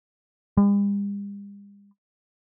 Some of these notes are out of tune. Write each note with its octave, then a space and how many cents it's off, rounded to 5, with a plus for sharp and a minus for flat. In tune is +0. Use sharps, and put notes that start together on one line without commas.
G3 +45